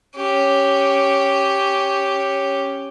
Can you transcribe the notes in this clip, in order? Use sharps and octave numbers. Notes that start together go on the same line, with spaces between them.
C#4 G4